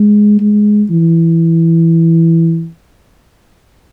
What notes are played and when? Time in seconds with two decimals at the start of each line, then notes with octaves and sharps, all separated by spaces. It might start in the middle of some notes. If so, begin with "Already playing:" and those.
Already playing: G#3
0.40 G#3
0.90 E3